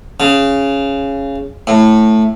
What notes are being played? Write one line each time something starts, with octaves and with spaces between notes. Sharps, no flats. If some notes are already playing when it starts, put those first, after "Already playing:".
C#3
A2